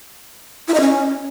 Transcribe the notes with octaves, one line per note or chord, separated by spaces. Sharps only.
E4
D#5
C#4